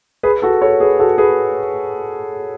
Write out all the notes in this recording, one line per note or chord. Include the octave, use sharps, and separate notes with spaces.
G#4 B4
F#4 A4
A4 C#5
G#4 B4
F#4 A4
G#4 B4